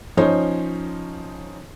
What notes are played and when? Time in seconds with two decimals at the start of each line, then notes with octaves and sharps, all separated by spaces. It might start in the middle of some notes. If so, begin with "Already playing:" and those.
0.17 F3 C#4 D#4 C5 C#5